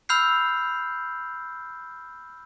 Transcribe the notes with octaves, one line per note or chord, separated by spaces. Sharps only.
B5 E6 F6 G6 C7